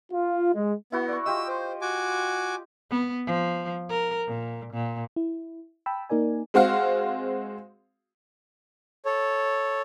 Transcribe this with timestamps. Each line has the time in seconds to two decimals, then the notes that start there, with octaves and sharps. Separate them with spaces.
0.11 F4
0.53 G#3
0.92 B3 E4 F#4
1.08 D5 C#6
1.26 F4 G4 D#5 E6
1.48 C5
1.82 F#4 G#5 D6
2.91 B3
3.26 F3
3.89 A#4
4.28 A#2
4.74 A#2
5.16 E4
5.86 G5 A5 B5 E6
6.10 A#3 D#4 A#4 D5 G#5
6.54 G#3 C4 F#4 F5
9.05 A4 C#5